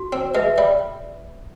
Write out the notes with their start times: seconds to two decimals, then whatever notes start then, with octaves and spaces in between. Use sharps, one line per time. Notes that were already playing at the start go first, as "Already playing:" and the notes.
Already playing: F#4
0.13 C4
0.35 G#3 B4 E5
0.58 G3